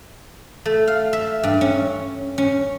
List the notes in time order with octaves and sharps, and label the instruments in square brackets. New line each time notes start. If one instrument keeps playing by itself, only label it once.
[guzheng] A3
F5
E5
G2
C#4
C#4